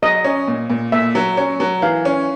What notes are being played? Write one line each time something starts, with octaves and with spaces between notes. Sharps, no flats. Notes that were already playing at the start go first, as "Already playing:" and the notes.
F#3 D#5
C#4
A#2
A#2
A#2 E5
F#3
C#4
F#3
E3 F5
C#4